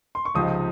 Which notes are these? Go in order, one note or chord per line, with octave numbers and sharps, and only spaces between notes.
C6
C#6
C#2 C3 F3 C4 D#4 D#6